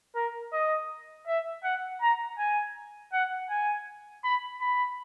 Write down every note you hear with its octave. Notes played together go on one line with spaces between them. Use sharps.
A#4
D#5
E5
F#5
A#5
G#5
F#5
G#5
B5
B5